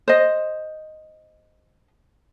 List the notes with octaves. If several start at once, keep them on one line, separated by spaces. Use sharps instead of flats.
C5 D#5